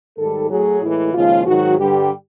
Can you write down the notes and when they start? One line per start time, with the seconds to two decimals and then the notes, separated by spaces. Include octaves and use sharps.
0.18 G#2 D#3 G3 A4
0.50 A2 F#3 G#4
0.81 A2 E3 G#3 E4
1.13 D#2 C#3 F3 G#3 F4
1.46 G#2 D#3 F#3 F#4
1.78 G2 D3 G3 G4